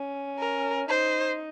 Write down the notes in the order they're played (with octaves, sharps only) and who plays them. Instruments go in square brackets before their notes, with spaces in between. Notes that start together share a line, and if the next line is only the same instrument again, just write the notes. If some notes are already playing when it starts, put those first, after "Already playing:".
Already playing: [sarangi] C#4
[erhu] A#4
[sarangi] D#4 [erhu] C5